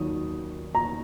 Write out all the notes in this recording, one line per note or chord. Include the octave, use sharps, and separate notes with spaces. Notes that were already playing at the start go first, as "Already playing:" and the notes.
Already playing: D#2 D#3 F#3 D#6
A#5